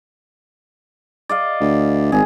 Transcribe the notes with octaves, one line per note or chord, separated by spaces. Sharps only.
D5 D#5 F5
D2
G#1 G#4